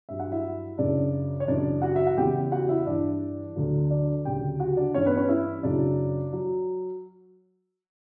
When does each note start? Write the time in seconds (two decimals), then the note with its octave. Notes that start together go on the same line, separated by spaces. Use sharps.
0.09 G2 F#3 E5
0.20 F#5
0.32 E4 E5
0.78 F#2 C#3 F#3 D4 D5
1.40 C#5
1.47 F#2 C#3 E3 D4 D5
1.82 F#4 F#5
1.96 E5
2.07 F#5
2.17 E2 C#3 E3 G4 G5
2.52 F#4 F#5
2.69 E4 E5
2.86 G2 E3 D4 D5
3.56 D2 D3 F#3
3.90 D4 D5
4.24 D2 C#3 F#3 G4 G5
4.60 F#4 F#5
4.77 D4 D5
4.94 G2 E3 C#4 C#5
5.05 B3 B4
5.17 C#4 C#5
5.29 E4 E5
5.63 F#2 C#3 F#3 D4 D5
6.33 F#3